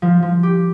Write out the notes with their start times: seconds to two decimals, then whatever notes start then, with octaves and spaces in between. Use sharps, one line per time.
0.02 F3
0.22 F3
0.43 G4